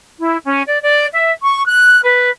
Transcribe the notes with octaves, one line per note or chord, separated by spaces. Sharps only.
E4
C#4
D5
D5
E5
C#6
F#6
B4